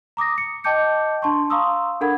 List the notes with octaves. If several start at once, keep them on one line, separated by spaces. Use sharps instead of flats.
A#5 D6 D#6 A#6
C#7
D#5 G5 A5 D6 G6 C#7
D4 A5 C6 C#6
F5 A#5 C6 C#6 D#6 E6
D4 A4 A#4 F#5 B5 G#6